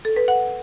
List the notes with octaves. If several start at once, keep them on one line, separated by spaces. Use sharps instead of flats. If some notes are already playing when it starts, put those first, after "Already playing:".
A4
B4
F#5